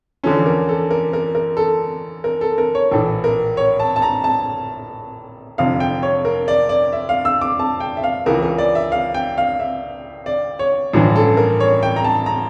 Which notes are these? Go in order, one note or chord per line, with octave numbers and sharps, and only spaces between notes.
E2 D3 F3 C#4 A4
A#4
A4
A#4
A#4
A#4
A4
A#4
A4
A#4
C#5
A#1 A2 E3 A4
A#4
C#5
A5
A5
A#5
A5
F1 F2 D3 F5
G5
C#5
A#4
D5
D5
E5
F5
E6
D6
A5
G5
E5
F5
C#2 C#3 E3 A#4
A#4
D5
E5
F5
G5
F5
E5
D5
C#5
A1 G2 D3 F3 C#4
A4
A#4
C#5
G5
A#5
A5
A#5